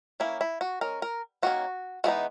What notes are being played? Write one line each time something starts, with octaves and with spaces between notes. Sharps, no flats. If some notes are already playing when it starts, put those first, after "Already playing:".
E3 A#3 C#4 E4
E4
F#4
G#3 C#4 A#4
A#4
D#3 A#3 C#4 F#4
E3 G#3 B3 D#4 F#4